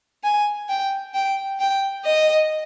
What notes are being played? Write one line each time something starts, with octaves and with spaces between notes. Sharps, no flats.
G#5
G5
G5
G5
D#5